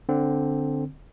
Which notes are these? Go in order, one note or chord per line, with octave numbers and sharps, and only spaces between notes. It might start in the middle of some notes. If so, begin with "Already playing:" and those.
D3 C4